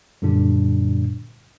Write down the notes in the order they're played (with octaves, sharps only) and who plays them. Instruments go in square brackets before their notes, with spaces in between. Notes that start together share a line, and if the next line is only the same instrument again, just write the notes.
[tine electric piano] F#2 A#2 D3 G3 D4